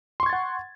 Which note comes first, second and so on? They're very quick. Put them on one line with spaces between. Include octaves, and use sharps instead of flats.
C6 C#6 G#6 A6 F#5